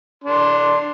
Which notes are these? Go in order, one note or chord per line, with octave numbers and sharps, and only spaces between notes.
D4 C6